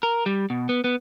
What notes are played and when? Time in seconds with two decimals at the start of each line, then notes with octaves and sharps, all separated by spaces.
0.03 A#4
0.26 G3
0.50 B2
0.69 B3
0.84 B3